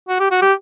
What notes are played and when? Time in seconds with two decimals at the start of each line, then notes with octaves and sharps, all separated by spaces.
0.08 F#4
0.20 G4
0.31 F#4
0.42 G4